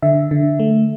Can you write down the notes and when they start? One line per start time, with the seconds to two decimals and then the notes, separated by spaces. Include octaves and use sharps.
0.02 D3 E5
0.31 D3
0.59 A3